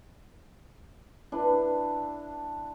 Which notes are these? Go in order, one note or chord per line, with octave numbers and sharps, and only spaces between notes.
D4 E4 B4